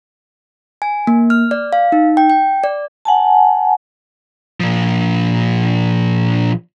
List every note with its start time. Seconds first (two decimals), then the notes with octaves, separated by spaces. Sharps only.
0.82 G#5
1.07 A#3
1.30 F6
1.51 D5
1.73 F5
1.92 D#4
2.17 G5
2.30 G5
2.64 D5
3.05 F#5 G#5 A5
4.60 A#2 F3